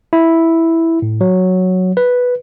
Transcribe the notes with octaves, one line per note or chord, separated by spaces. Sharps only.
E4
A2
F#3
B4